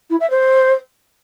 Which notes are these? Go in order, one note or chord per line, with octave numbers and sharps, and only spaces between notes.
E4
E5
C5